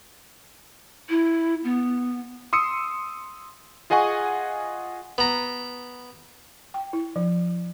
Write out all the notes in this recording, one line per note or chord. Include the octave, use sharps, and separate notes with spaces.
E4
B3
C6 D#6 E6 C#7
F4 G#4 D#5 F#5 G#5 C#6
B3 A#5
G5
E4
F3